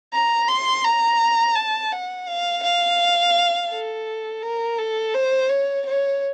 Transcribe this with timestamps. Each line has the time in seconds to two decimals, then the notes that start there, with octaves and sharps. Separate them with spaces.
0.13 A#5
0.49 C6
0.84 A#5
1.55 A5
1.92 F#5
2.28 F5
2.63 F5
3.70 A4
4.42 A#4
4.78 A4
5.14 C5
5.50 C#5
5.86 C#5